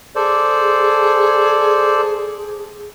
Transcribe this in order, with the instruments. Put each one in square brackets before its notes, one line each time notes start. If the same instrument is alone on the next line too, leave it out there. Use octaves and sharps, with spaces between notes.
[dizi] G#4 [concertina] A4 C5 D5